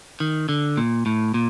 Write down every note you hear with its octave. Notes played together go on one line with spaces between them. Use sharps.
D#3
D3
A#2
A2
A#2